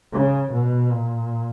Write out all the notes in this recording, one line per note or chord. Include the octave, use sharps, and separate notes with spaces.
C#3
B2
A#2